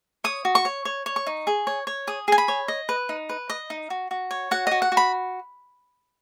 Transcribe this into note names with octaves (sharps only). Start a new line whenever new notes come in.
C#5 D#6
F#4
C#6
C#5
C#5
C#5
C#6
D#4
G#4
C#5
C#5
G#4 D#6
G#4 G#5
B5
C#5
D#5
B4
D#4
B4
D#5
D#4
F#4
F#4
C#5
F#4 F#5
F#4 D#5
F#5
F#4
B5